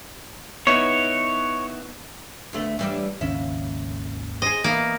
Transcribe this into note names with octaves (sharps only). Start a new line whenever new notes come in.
B3 D#4 E4 C#5
D2 A3 B3
E3 G3 D4
G#1 D#2 C#3 C#4 E5
C4 G#4 D#5
E3 A#3 B3